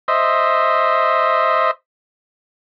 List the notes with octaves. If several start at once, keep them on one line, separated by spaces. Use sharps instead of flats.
C5 D#5 E5